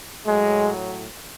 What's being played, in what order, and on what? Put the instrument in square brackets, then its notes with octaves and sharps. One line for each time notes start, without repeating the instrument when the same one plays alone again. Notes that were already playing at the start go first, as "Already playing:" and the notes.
[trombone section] A2 F#3 G#3